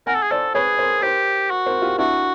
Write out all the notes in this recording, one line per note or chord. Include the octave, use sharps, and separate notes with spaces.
A#4 F#5 G#5
A4
G#4
A4 C5 D5
G#4 B4 C#5
A#4 C5
G4 A#4 C5
F#4
A#4 C5
F4 G4
D4 E4 F#4